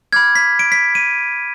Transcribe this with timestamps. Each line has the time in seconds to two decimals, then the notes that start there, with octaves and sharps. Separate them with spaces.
0.13 B5 D6 F6 G#6
0.35 B6
0.59 D7
0.72 B6
0.95 D#7